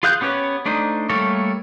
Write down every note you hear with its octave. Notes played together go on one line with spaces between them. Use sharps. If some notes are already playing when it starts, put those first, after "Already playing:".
F4 G#4 F5 F#6 G6
B3 C#4 G4 B4 C#5
A3 D4 D#4 C5
G3 A3 A#3 A4 C#5